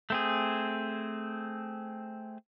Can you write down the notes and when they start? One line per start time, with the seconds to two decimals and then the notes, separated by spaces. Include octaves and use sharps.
0.10 A3 C4 G#4